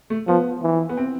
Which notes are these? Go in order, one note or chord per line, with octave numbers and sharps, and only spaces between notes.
A3
F3 B3
E3
B3
C4